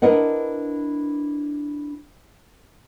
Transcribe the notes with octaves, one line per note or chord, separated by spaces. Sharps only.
D4 E4 A#4 B4 D#5 F#5